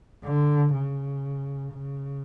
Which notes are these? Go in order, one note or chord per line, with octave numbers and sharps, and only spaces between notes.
D3
C#3
C#3